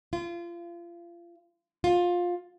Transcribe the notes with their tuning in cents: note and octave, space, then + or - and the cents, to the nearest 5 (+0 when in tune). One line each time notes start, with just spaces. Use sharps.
F4 -30
F4 +15